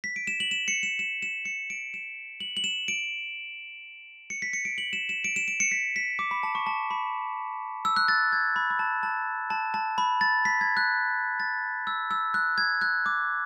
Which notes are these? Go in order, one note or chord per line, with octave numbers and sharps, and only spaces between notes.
B6
D7
E7
F#7
E7
C#7
E7
E7
E7
C#7
D7
E7
F#7
F#7
E7
D7
C#7
B6
C#7
D7
F#7
E7
E7
D7
E7
D7
C#7
B6
B6
D6
B5
A5
C#6
A5
B5
E6
F#6
A6
G#6
B5
B5
A5
A5
A5
A5
B5
A6
B6
G#6
F#6
A6
E6
E6
F#6
G#6
F#6
D6